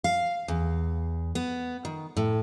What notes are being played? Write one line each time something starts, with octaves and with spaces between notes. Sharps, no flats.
F5
E2
B3
D#3
A2